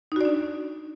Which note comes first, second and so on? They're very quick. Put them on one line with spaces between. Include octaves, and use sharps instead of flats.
D#4 F#4 D5 D4